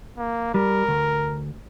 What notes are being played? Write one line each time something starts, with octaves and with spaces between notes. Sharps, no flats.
A#3
G3 A#4
D2